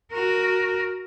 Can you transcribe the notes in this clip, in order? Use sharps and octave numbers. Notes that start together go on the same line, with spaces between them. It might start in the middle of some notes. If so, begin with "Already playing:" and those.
F#4 A#4